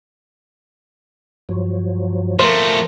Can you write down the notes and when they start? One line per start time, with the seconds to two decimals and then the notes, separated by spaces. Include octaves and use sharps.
1.49 G2 F3 F#3
2.40 F3 A3 A#4 C5